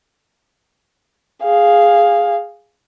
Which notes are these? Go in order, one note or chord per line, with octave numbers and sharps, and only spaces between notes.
G#4 F5